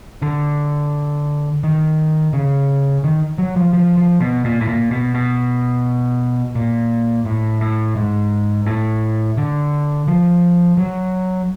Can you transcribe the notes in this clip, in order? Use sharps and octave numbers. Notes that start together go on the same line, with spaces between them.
D3
D#3
C#3
D#3
F#3
F3
F3
F3
B2
A#2
A2
A#2
B2
B2
A#2
A2
A2
G#2
A2
D3
F3
F#3